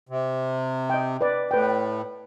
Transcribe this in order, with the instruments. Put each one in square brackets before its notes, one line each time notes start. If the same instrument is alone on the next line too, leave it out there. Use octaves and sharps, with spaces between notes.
[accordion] C3
[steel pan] D#5 G5
B4 D5
[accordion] A2 [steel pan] B4 G5